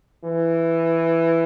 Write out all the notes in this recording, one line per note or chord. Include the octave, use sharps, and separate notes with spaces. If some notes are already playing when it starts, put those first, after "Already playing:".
E3